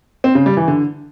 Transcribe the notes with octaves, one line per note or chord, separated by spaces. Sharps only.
C4
C#3
G3
E3
D3